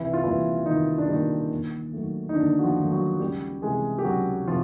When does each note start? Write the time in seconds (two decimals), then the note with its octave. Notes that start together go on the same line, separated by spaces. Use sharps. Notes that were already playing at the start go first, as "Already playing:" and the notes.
Already playing: C2 E3 E4
0.13 F4
0.24 A#2 E3 G3 E4
0.66 C2 D#3 D#4
0.98 D4
1.08 A#2 D#3 G3 D#4
1.51 D#2
1.93 D#3 F#3 A3
2.29 D#4
2.35 D#2 D3 D4
2.59 F#4
2.63 F3 F4
2.79 D#3 F#3 A3
2.91 F#3 F#4
3.20 C#2 G3 G4
3.62 C3 E3 G#3 G#4
3.99 G4
4.04 C#2 F#3 F#4
4.47 C3 F3 F4